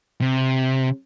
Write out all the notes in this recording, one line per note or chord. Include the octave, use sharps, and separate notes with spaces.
C3